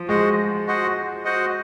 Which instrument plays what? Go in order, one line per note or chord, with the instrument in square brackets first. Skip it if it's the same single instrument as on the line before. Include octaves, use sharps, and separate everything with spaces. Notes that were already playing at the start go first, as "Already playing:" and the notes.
Already playing: [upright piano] F3
[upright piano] G#3 [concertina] F#4 C5 D#5 F#5
[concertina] F#4 C5 D#5 F#5
F#4 C5 D#5 F#5